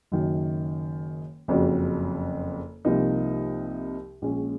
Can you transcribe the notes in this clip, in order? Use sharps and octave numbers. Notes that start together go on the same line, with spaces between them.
F#1 F#2 D#3
F#1 F2 C#3 F#3
C2 C3 F3 A#3 D#4
A#1 A#2 G#3 C#4